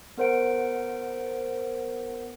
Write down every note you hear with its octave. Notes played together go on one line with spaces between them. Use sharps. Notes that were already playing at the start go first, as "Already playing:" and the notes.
B3 A#4 C5 F#5 D7